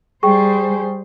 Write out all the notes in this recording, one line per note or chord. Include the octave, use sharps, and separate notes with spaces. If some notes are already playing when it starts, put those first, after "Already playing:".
G3 G#4 C5 G5 C#6